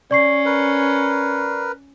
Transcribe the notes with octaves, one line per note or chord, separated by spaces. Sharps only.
C#4 D5 C#6 C7
A#4 B4